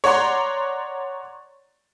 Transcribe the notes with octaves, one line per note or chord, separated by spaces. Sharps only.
C#5 D5 F#5 A#5 C6